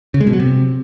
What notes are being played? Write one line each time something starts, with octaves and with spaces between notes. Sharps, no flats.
C#3
G#3
B2
F#3
C3